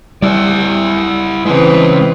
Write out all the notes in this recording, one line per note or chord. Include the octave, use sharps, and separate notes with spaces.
G3 E4 D5
C#3 E3 G#3 C4 B4